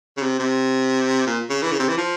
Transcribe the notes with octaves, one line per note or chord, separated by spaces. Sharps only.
C#3
C3
C3
A#2
C#3
E3
C#3
C3
E3
F3